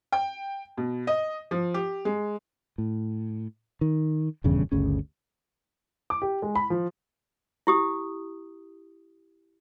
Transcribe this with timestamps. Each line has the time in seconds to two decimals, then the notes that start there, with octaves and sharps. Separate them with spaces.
0.12 G5
0.77 B2
1.07 D#5
1.51 F3
1.74 G4
2.05 G#3
2.78 A2
3.81 D#3
4.44 D#1 E2 G2 C#3
4.72 G1 D2 C#3 C#4
6.10 D6
6.22 G4
6.42 G#3
6.56 B5
6.70 F3
7.67 E4 G4 D#6